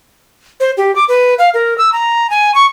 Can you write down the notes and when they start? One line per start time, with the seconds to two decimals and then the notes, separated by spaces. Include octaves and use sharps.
0.60 C5
0.77 G4
0.95 D6
1.08 B4
1.39 F5
1.54 A#4
1.78 E6
1.92 A#5
2.30 G#5
2.54 C#6